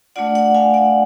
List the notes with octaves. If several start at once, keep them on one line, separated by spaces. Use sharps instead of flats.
A3 D4 F4 D5 F#5
D5 F#5
F5 G#5
D5 F#5